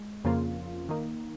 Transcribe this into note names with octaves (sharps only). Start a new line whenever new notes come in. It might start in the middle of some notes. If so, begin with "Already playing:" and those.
Already playing: G#3
F2 C#3 F3 A#3 F4
D#3 A#3 D#4